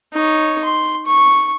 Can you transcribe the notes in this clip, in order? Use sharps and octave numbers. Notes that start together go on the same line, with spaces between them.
D#4 C#5
C6
C#6